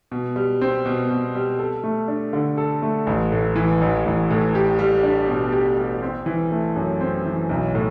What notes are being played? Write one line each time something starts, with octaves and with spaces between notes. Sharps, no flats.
B2
G3
C4
B2
B2
G3
A4
A3
D4
D3
A4
A3
A1
A2
E3
A1
A1
A2
G4
G3
D4
B2
G4
G3
C4
E3
A3
F#2
C4
E3
B1
A2